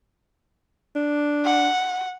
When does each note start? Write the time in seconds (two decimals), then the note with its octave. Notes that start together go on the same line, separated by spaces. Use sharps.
0.96 D4
1.45 F#5